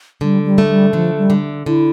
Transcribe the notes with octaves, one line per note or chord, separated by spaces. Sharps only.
D3 G3
G3
A3
G3
D3 F3
G3
D3
D3 E4